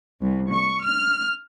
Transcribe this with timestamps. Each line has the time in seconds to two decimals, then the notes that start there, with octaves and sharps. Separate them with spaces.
0.22 C2
0.52 C#6
0.84 F6